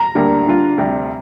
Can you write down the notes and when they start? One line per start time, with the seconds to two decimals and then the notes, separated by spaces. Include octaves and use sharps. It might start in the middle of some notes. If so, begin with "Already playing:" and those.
Already playing: A#5
0.15 D2 D3 G3 A#3
0.46 D3 G3 D4 F4
0.78 D2 C3 G3